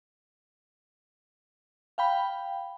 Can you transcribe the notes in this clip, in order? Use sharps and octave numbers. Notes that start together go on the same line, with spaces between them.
F5 G5 B5